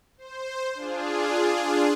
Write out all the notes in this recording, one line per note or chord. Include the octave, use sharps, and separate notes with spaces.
C5
D4 F4 G#4